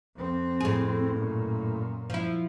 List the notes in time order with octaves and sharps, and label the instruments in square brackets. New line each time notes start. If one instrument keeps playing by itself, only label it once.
[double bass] F2 C4
[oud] A2 G#4
[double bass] F#2 A#2
[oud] F3 E4